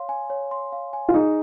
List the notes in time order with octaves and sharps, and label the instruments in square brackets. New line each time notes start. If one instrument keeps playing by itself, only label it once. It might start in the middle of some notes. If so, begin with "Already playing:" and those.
Already playing: [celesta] C#5 F5 C6
G#5
C#5
C6
F5
G#5
[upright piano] F4
[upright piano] D#4 [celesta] G#4